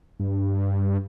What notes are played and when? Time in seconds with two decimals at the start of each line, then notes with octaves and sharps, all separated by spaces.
0.19 G2